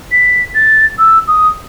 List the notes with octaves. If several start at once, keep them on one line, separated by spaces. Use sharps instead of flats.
B6
A6
E6
D#6